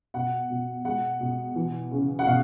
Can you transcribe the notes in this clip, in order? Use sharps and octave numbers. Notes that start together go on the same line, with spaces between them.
B2 F#5
B2
G#3 F#5
B2
E3
C#3
F#5
B2 F5